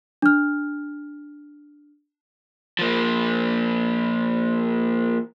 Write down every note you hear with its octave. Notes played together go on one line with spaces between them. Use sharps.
D4 F6
F3 A#3